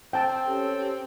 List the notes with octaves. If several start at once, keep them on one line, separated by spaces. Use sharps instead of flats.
C4 G5 A5
C#4 G4 A4